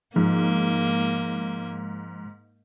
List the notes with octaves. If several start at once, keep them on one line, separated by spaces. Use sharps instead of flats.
G#2 F3 A#3